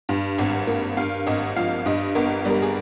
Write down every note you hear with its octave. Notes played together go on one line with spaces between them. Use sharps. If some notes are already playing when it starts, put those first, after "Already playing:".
G2
G#1
A#3
G2 F5
G#1 D#5
F3 F5
G2 D#5
G1 A#4
G3 A#4
G#4